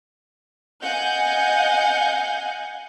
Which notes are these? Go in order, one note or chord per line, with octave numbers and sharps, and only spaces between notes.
D#5 F5 F#5 G#5 G6